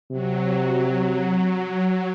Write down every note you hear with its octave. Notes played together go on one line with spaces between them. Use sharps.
C3 F#3